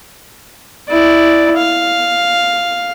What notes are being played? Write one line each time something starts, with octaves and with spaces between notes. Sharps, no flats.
E4 D5
F5